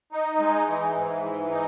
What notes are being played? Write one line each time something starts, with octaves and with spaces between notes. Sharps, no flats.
D#4
G#3
E3
G#2
E3
D#4